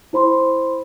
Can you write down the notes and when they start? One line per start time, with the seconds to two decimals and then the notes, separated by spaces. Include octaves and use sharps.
0.13 E4 C5 B5 C6